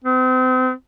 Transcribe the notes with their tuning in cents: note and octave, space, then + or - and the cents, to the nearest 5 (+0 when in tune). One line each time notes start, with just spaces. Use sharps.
C4 -35